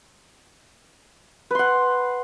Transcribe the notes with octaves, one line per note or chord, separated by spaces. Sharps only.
B4 F#5 C6